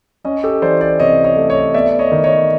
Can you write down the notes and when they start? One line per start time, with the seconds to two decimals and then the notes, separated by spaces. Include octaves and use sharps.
0.24 C#4 C#5 D#5
0.44 G4 A4
0.62 E3 C5 D5
0.81 C5 D5
1.00 C3 C#5 D#5
1.24 C#5 D#5
1.36 A3
1.49 C#5 D#5
1.74 B3 D5 E5
1.99 C#5 D#5
2.12 D#3
2.24 C#5 D#5